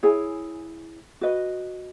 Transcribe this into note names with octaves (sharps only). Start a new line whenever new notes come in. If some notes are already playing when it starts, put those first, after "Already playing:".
E4 G#4 C#5 G#5
F#4 B4 D#5